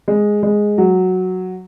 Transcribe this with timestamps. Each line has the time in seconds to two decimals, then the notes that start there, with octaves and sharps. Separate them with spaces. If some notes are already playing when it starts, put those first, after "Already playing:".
0.08 G#3
0.43 G#3
0.78 F#3